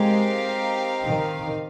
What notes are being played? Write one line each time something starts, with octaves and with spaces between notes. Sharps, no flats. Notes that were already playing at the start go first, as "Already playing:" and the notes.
Already playing: G#3 C4 D#4 G4 A#4 F5
D#3